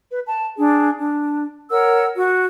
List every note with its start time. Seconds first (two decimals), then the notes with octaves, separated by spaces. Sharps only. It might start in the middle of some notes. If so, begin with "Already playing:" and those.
0.10 B4
0.27 A5
0.58 D4 G#4
0.98 D4
1.71 A#4 C#5 F#5 E6
2.16 F#4